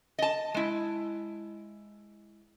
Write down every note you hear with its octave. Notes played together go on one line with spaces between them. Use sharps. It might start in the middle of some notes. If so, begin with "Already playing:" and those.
D#5 A5
G#3 E4